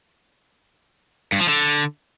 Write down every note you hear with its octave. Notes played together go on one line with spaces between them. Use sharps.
G2
F3
D3